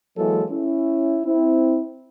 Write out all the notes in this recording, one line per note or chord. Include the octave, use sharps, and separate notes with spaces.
E3 F#3 G#3 A#3 A4
C#4 E4
C4 E4